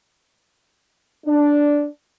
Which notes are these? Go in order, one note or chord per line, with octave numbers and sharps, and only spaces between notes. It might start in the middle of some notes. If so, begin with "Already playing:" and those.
D4